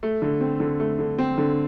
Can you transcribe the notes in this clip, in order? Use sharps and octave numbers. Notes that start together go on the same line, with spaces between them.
A3
D3
C4
D3
A3
D3
C4
D3